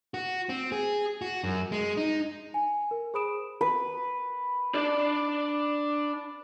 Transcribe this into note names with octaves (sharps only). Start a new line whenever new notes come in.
F#4
C4
G#4
F#4
F#2
G#3
D#4
G#5
A#4
G#4 C5 B5 D#6 D7 E7
B4
D4 D5